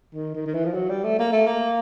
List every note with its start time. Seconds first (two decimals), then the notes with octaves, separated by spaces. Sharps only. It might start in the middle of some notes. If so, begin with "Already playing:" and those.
0.14 D#3
0.35 D#3
0.46 D#3
0.54 E3
0.65 F3
0.74 F#3
0.90 G3
1.04 A3
1.19 A#3
1.32 A3
1.47 A#3